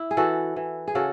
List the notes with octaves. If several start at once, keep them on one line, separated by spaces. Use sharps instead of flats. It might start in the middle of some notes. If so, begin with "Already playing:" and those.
Already playing: E4
G#4
E3 F#4 A4
E3
G#4
C#3 F#4 A4